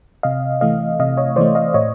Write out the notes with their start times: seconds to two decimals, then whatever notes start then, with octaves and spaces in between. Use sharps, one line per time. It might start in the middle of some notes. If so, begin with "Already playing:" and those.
0.23 C3 D#5 F5
0.61 E3 A3 D#5 F5
0.99 C3 D#5 F5
1.17 C#5 D#5
1.36 E3 A3 C5 D5
1.55 D#5 F5
1.74 A2 C#5 D#5